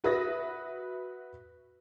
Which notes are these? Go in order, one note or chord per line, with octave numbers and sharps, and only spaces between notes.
F#4 B4 E5 D#6 A#6